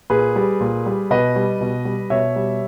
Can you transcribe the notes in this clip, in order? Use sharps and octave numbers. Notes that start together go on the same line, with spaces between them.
A#2 G#4 B4
G3
A#2
G3
B2 B4 D#5
G3
B2
G3
B2 C#5 E5
G3